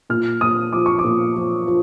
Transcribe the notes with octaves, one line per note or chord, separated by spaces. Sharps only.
A#2 F6
A#2 D#6
F3 D6
C#6
D6
A#2
F3
F3